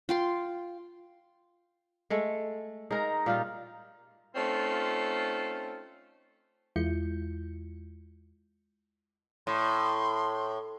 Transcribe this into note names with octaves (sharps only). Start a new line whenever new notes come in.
F4 G5 C6
G#3 A3 A4
G#3 D#4 A#4 A#5
A#2 G3 F4 F5
A3 C4 C#4 D#4 F4
E2 G#3 E4 F4 G6 C#7
A2 C6